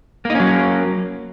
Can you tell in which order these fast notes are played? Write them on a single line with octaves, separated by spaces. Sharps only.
A#3 D#4 C#4 F#3